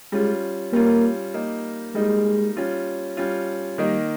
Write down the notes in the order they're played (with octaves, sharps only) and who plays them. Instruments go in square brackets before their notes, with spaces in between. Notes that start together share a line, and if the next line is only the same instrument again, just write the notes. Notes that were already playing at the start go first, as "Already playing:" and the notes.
[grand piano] G3 C#4 F4 [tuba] G#3
[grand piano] G3 C#4 F4 [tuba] A#3
[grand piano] G3 A#3 D#4
[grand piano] G3 A#3 D#4 [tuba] G#3
[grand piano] G3 C#4 F4
G3 C#4 F4
[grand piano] D#3 A#3 D#4 [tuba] G3